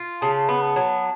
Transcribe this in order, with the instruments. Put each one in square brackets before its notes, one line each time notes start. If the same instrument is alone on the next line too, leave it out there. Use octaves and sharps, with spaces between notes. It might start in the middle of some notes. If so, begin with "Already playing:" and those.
Already playing: [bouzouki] F4
[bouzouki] C#3 [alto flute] A5
[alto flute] A5
[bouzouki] B3 [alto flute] B5
[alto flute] A5
[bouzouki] F#3